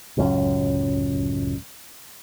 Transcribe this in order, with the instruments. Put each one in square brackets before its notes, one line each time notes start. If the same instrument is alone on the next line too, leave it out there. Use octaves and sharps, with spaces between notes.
[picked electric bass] D1 C#2 F#2 C#4